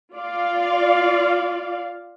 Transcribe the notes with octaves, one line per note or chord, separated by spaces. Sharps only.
F4 D5 F5